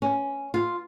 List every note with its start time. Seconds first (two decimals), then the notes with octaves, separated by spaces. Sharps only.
0.02 C#4
0.54 F4